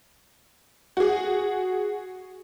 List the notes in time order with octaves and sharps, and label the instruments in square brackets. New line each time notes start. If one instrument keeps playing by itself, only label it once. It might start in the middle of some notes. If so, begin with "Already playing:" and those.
[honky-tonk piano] F#4 G#4